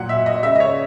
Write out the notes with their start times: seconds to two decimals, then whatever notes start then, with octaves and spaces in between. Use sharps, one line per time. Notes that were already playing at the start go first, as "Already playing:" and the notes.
Already playing: A#2 F#3 F#5
0.09 E5
0.26 D#5
0.43 C#3 G#3 E5
0.55 D#5
0.60 C#5